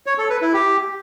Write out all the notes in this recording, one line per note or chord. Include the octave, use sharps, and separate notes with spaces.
C#5
A4
B4
E4
G4